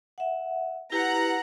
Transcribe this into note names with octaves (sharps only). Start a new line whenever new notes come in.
E5 F#5
E4 G4 B4 F#5 A#5